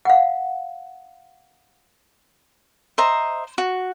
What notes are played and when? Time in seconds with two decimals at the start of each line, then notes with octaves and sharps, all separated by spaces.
0.05 F5 F#5
2.98 C5 D#5 E5 A#5
3.58 F#4